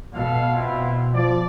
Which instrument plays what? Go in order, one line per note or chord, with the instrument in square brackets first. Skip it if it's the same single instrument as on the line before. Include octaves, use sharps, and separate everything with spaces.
[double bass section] B2 [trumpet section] A4 F5
[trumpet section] C4 E4 F4
[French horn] F3 [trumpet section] D5